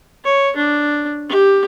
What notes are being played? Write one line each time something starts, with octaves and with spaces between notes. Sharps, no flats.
C#5
D4
G4